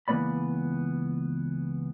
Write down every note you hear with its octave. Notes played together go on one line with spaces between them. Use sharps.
C#2 E3 A#3 B3 D5 B5